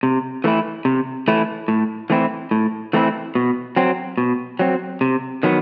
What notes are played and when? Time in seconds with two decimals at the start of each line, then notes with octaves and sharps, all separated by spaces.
0.03 C3
0.44 E3 A3 E4
0.85 C3
1.28 E3 A3 E4
1.68 A2
2.10 E3 A3 C4 E4
2.51 A2
2.93 E3 A3 C4 E4
3.35 B2
3.76 F#3 C4
4.18 B2
4.59 F#3 C4
5.01 C3
5.43 D#3 F#3 B3